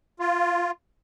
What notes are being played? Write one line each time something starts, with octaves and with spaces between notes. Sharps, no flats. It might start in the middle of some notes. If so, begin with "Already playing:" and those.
F4